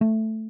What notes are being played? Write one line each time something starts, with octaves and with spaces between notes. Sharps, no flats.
A3